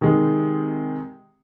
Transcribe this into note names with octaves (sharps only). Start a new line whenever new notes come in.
C3 D#3 G#3